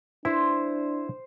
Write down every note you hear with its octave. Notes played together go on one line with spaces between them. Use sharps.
D4 E4 C5